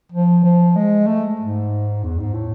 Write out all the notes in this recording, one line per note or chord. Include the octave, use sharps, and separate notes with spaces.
F3
F3
G#3
A3
G#2
E2
G#2
A2